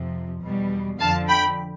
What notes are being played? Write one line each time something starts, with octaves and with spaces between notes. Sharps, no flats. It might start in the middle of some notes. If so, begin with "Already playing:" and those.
Already playing: F2 C3 F3
E2 B2 G3
F2 D3 F3 F5 A5
G5 B5